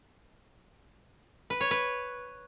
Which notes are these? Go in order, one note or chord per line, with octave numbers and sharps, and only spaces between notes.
B4
C#5
B4